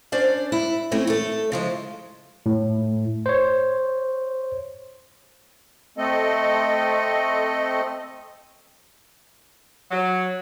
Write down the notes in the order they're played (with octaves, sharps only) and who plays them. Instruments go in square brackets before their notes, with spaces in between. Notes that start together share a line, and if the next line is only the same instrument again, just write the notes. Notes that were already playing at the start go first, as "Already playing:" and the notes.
[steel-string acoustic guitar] C#4 D4 C5 D5
E4
E3 A3 C4 C#4
A3 A4
C#3 F3 G#3
[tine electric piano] A2
C5 C#5
[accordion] A3 C4 A4 D#5
[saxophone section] F#3